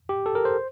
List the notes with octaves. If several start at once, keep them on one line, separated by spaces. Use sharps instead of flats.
G4
A4
A#4
C5